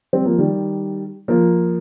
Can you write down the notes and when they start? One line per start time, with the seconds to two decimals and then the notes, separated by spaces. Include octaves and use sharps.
0.13 G3 C4
0.25 F3 A#3
0.39 D#3 G3
1.28 F3 A#3